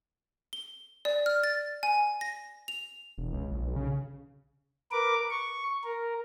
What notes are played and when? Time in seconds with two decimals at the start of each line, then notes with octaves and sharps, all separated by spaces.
0.53 G7
1.05 D5
1.26 F6
1.44 A6
1.83 G#5
2.21 A#6
2.68 F7
3.18 E1
3.33 C#2
3.51 A#1
3.62 B1
3.76 C#3
4.92 A#4 B4 D6
5.30 C#6
5.84 A#4